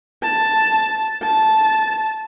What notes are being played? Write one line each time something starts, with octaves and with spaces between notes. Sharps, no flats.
A5
A5